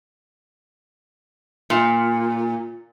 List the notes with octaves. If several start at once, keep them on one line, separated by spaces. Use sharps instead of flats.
A#2